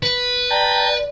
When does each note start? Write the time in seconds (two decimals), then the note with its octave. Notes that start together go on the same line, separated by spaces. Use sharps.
0.03 B4
0.50 D5 G5 A5 A#5